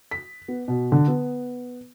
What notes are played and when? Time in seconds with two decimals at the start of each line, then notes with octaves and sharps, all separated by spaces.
0.11 B6
0.48 B3
0.68 B2
0.92 D3
1.08 B3